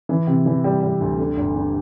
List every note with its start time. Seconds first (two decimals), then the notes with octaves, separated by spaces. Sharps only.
0.09 E3
0.27 C3
0.46 E3
0.64 G3
0.83 G3
1.01 D2
1.19 D3
1.37 G1
1.55 D3